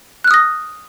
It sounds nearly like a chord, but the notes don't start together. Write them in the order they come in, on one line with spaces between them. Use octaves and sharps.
F#6 F6 D#6 A#6